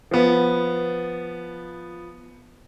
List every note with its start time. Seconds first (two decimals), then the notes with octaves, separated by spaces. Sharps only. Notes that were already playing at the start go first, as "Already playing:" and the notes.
0.11 F3 B3